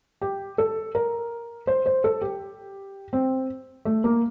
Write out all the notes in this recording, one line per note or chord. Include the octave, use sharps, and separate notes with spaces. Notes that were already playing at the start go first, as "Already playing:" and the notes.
G4
A4
A#4
C5
C5
A4
G4
C4
A3
A#3